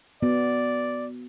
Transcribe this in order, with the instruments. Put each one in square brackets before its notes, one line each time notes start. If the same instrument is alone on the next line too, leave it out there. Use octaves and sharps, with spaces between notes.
[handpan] B3 F#4 [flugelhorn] D5